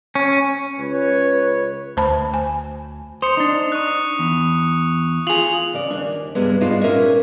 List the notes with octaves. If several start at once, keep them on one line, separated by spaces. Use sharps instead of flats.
C#4
C#2 B4 C#5
D2 C5 A5 B5
G#5
C5 D#6 C#7
D4 D#4
C#6 D#6 F#6
E2
F4 G#4 F7 F#7
C#3 D5
D#2 D4
G2 C3 G#3 B3
G#2 B2 G#3 D4 D#4 F4
A#2 C#4 A#4 E5